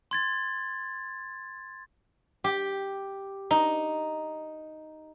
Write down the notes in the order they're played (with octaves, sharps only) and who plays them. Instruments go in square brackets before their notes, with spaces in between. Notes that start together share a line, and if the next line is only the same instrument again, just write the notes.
[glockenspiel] C6 G#6 A6
[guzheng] G4
D#4